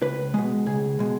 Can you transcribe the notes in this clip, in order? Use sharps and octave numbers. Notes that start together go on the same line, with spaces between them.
C#2 B4
B2 G#3
C#2 G#4
B2 G#3